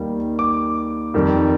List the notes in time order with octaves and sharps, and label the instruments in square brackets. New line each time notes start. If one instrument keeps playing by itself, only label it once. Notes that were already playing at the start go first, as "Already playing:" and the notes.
Already playing: [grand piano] D#2 D#3 G3
D6
F2 D#3 G3